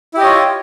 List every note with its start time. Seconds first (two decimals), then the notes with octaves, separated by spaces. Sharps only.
0.14 E4
0.17 G4
0.20 D#5
0.23 C#5
0.26 F4